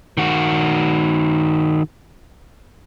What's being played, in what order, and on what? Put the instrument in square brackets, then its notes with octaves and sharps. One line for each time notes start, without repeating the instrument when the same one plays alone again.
[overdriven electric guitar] D#3 F#4